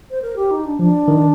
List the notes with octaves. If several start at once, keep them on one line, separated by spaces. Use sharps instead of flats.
C5
A#4
G4
D#4
D4
F3 D4
D#3